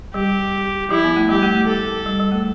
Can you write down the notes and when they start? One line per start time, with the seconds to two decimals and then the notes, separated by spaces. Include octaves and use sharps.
0.14 G3 G4
0.91 F3 E4
1.04 B3
1.16 A3
1.29 G3 G4
1.42 A3
1.55 A3
1.67 A4
2.06 G3
2.20 G3
2.32 A3